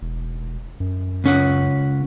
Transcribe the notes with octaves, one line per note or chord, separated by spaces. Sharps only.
E1
F#2
C#2 C#4 F#5